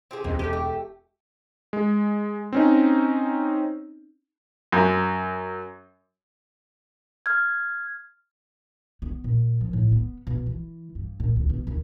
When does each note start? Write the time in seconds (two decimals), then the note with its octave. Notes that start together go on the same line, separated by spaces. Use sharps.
0.11 C4 G4 G#4
0.24 E1 F2 C4 D#5
0.39 G#3 A3 D4 G4
0.53 A3
1.73 G#3
2.53 C4 C#4 D#4
4.72 F#2
7.26 F6 G#6
9.02 B3
9.24 A#2
9.61 F3
9.73 A2
9.92 B3
10.27 B2
10.46 E3
10.95 G2
11.20 A#2
11.36 D2
11.50 B2
11.67 D#2